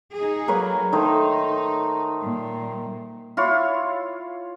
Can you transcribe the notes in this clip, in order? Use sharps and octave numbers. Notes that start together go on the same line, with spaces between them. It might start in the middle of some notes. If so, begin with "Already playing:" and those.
D#4 G#4
F#3 A#3 B4 C#5
D#3 A3 D#4 C5
A#2 G3
E4 F4 C#5